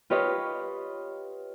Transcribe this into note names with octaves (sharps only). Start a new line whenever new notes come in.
F4 G4 B4 C#5 D#5